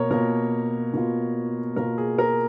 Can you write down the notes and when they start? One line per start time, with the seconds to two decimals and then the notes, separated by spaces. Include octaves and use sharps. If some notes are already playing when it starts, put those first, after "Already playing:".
Already playing: B2 A#3 A#4 C#5
0.11 B2 A#3 F4 A#4
0.94 B2 A#3 F4
1.76 B2 A#3 F4 A#4
1.98 G#4
2.18 A#4